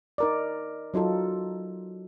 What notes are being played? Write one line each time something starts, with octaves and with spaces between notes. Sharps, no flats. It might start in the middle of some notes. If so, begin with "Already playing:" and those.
D#4 A#4 D5
F#3 D#4 F4 A4